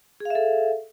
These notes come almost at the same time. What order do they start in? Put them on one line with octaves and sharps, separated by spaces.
G#4 F5 E5 A4